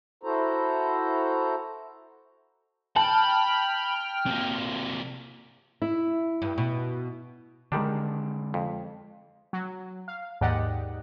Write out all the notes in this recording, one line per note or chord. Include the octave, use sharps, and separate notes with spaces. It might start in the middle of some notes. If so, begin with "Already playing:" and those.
E4 F#4 A4 C5 A#5
G5 A5 B5 F6
C3 A#3
E4
G2
B2
D3 D#3 G3 G#3 D4
F2
F#3
F5
D#2 G#2 G4 D5 D#5 F#5